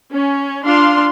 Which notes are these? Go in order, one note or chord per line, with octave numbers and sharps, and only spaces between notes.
C#4
D4 F4 F5 C6